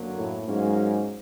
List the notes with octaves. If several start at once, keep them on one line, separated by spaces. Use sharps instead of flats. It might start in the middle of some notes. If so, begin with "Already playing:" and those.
Already playing: F#2 D3 F#3 A#3
A2
G#2 F#3 A#3 C#4